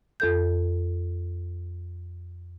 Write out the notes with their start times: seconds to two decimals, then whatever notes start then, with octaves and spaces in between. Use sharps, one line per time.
0.20 F2 A4 G6